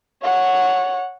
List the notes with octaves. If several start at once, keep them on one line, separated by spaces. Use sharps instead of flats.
C#5 F#5